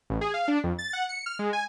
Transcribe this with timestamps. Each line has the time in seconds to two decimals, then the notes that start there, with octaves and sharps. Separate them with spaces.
0.10 A1
0.21 G#4
0.34 F5
0.48 D4
0.64 F2
0.79 A6
0.93 F#5
1.09 C#7
1.26 F6
1.39 G#3
1.53 G#5